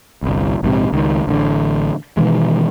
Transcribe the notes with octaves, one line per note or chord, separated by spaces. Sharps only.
G1 C2
A#1 G#2 C3
C#2 D#3
A1 D3
B2 D#3 E3 G#3